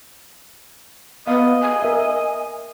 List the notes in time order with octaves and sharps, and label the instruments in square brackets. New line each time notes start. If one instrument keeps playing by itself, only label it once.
[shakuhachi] B3 [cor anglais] D#5 [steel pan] F5
[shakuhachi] G#5
[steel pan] A#4 E5